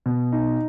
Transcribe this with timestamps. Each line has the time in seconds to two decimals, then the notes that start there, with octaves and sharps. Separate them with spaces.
0.06 B2
0.32 D#4